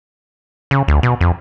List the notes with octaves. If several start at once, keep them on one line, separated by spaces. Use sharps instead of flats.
C#3
D2
B2
F2